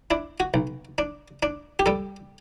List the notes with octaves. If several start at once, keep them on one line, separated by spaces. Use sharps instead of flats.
D4 E4
F#4
B1
D4
D4
G4
G3 A4